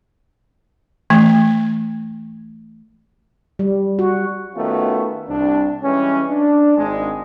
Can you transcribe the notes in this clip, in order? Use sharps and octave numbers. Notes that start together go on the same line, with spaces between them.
E3 A3
G3
F#4
D#3 A3 B3 C#4 F4 F#4
C2 D4
E3 G3 G#3 C#4
D4
G#1 G#3